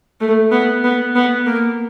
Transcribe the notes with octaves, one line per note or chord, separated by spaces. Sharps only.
A3
B3
B3
B3
A#3